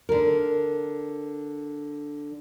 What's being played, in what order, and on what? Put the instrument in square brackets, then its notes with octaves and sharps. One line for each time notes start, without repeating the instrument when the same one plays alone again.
[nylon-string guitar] D3 A#4